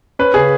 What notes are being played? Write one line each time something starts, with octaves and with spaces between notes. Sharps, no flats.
C#4 B4
C#3 G#4